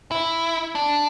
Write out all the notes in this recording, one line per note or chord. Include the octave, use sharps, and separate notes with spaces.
E4
D4